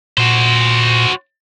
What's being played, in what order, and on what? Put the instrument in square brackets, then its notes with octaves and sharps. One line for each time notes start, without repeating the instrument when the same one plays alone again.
[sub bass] A#2 [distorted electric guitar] F#4 C5